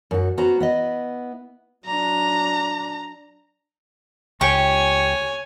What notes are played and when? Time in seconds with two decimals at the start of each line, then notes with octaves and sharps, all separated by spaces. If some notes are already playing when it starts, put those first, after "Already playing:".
0.11 F#2 F#4
0.38 B3 C#4 F#4 C5 A#5
0.60 B3 E4 D#5
1.86 F#3 D4 A#5
4.41 C#2 G4 C#5 G#5 C#6